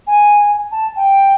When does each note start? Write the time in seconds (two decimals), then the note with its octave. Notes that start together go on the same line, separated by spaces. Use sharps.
0.07 G#5
0.71 A5
0.96 G5